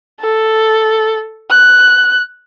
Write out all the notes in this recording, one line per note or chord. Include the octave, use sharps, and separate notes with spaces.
A4
F#6